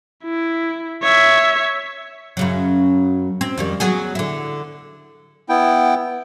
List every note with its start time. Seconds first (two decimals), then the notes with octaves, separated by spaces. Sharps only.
0.24 E4
1.03 C#5 E5
2.37 F#2 C#3 F#3
3.41 C4
3.58 F2 D#3 G3
3.80 F#3 B3 G#4
4.15 D3 E4
5.49 B3 E4 G5